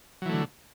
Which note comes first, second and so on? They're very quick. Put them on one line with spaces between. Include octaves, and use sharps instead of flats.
F#3 E3 A3 D3